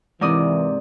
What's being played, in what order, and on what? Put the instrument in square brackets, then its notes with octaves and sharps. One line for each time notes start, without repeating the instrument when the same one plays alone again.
[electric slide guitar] G#2 C3 [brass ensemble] E3 [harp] A#4 D5 D#6